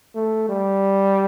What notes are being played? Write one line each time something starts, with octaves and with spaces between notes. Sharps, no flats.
A3
G3